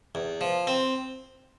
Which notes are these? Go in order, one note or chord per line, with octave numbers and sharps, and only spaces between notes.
E2
F3
C4